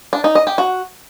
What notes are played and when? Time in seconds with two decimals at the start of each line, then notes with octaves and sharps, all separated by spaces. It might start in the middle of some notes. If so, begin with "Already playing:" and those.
0.13 D4
0.24 D#4
0.35 D#5
0.47 G4
0.58 F#4